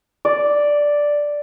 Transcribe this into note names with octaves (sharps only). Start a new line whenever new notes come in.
D5